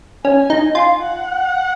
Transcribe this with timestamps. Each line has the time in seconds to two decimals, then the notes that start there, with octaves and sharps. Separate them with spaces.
0.25 C#4 G#5
0.50 D#4
0.63 G#5
0.75 F4
1.01 F#5